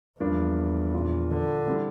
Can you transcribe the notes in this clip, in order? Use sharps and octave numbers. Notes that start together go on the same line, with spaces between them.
E2 G2 F3 A#3 D4
A#2 F3 A#3 D4 F4
D3
E3 G3 C4 G4